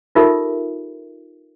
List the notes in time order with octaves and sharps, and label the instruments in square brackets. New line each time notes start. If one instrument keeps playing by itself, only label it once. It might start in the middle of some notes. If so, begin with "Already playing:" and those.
[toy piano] D#4 F4 G4 A4 A#4 E5